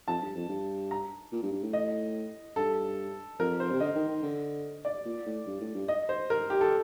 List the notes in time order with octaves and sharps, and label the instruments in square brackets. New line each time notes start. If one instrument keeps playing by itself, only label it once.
[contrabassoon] F2 [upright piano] A5
[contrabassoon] G2
F2
G2
[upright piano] A#5
[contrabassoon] A#2
G2
G2
A2
[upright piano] D#5
[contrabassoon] G2 [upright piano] A4
[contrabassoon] F2 [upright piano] A#4
[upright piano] C5
[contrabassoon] C3
[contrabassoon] D3 [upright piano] D#5
[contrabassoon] D#3
D#3
D3
[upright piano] D5
[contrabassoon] A#2
A2
G2
A2
G2
[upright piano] D#5
C5
A#4
G4
A4